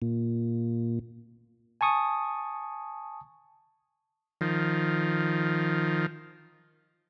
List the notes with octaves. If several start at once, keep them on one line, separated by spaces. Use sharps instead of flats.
A#2
G#5 A5 C#6 D#6
D#3 F3